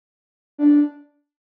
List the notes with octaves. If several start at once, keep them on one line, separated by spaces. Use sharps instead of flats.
D4